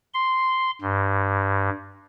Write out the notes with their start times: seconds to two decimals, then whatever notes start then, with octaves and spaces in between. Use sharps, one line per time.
0.14 C6
0.81 G2